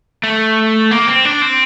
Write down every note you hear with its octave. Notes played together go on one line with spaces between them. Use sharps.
A3
A#3
C4
D4
C4